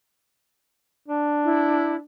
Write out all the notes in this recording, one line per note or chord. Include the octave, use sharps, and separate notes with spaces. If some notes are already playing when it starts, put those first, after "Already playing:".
D4
E4